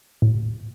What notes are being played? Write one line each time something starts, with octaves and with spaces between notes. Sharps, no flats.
A2